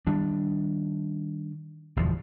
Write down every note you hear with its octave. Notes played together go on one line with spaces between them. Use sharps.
D#3 G3 D4
G1 E2 B2 F3